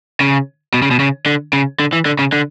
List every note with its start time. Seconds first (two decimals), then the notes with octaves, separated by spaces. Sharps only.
0.21 C#3
0.74 B2
0.82 C#3
0.91 B2
1.00 C#3
1.26 D3
1.53 C#3
1.80 D3
1.93 E3
2.06 D3
2.19 C#3
2.32 D3